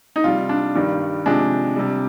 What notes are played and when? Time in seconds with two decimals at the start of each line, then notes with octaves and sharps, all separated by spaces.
0.16 D#4
0.24 C3 G3 F4
0.49 D4
0.75 G2 D#3 G3
1.26 C3 F3 G#3 D4
1.76 C3 G3